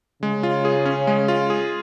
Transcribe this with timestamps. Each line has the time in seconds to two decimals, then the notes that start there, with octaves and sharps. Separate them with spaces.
0.22 C#3 G#3
0.43 F4
0.65 G#4
0.85 C#4
1.07 G#3
1.28 F4
1.50 G#4